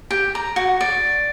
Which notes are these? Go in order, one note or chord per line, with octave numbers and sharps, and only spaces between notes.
G4
A#5
F#4
D5